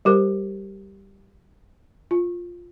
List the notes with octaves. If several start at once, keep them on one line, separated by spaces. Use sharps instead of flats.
G3 G4 A#4 C5
F4